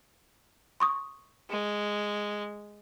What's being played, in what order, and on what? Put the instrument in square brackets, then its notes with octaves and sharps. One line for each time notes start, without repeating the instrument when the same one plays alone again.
[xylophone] C6 C#6 D#6
[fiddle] G#3